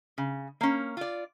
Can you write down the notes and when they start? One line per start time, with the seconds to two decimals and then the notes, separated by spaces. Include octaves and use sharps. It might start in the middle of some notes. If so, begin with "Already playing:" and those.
0.18 C#3
0.61 A#3 C#4
0.97 F4 D5